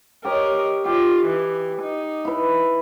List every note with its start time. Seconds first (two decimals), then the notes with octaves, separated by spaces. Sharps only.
0.25 G4 A#4 C#5 D#5
0.85 F4 G4 D#5
1.26 E3
1.82 D#4
2.25 E4 B4